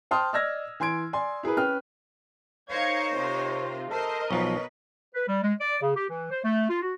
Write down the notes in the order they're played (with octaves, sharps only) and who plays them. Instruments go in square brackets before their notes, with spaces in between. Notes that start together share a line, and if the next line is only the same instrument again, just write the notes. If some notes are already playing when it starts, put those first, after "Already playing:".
[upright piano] C5 G5 A5 C6 D#6 F6
D5 D#5 E6 F6 G#6 A#6
E3 G#5 C6 G#6 D7
D5 G#5 C6
E4 G#4 A#4 B4
C#4 B4 G5 F6
[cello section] D#4 A#4 C5 [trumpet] C#5 [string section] F5 G#6 C#7
[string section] C3 F4
[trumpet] A4 [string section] A#4 D#5 [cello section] C5
[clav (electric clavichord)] B1 F3 [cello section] B2 B4 [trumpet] C#5
[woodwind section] B4
G3
G#3
D5
C#3
G4
E3
C5
A3
F4
F#4